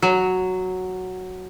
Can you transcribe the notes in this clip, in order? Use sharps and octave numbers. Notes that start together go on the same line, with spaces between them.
F#3